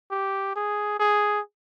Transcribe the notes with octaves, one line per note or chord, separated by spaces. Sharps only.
G4
G#4
G#4